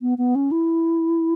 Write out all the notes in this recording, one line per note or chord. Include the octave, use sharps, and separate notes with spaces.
B3
B3
C#4
E4